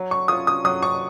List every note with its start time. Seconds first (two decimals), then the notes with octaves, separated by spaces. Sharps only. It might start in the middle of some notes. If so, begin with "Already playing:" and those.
Already playing: F#3
0.11 C#6
0.28 C#4 F4 D#6
0.47 D#6
0.65 F#3 D#6
0.83 C#6